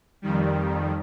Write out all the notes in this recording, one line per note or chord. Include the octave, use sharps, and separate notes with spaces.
F2 D#3 G3